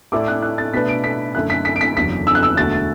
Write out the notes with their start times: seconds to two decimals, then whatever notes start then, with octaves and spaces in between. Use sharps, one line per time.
0.12 A2 A3 E4 D5 D6
0.28 F#6
0.42 F#6
0.58 A6
0.73 B2 A3 D4 B4 D5 B6
0.89 D7
1.04 B6
1.35 F#2 D3 A3 E4 A4 F#6
1.50 B6
1.65 B6
1.76 D7
1.81 B6
1.96 F#1 E2 D3 F#3 D4 B6
2.27 E6
2.35 F#6
2.43 E6
2.57 E1 D2 D3 A3 F#4 A6